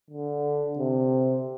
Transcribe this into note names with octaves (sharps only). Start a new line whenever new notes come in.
D3
C3